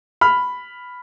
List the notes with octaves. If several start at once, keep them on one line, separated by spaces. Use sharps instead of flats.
B5 F6